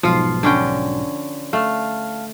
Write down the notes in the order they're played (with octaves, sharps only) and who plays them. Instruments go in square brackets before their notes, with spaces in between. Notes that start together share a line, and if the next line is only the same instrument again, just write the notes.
[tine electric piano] B1 G#2 B2 [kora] F3 F4
[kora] D3 C#4 G5
[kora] A3 [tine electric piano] F5 A5 F6